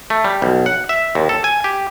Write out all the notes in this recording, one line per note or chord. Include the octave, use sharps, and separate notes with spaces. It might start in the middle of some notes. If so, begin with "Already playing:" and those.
A3
G3
B1
F#5
E5
D#2
A4
G#5
G4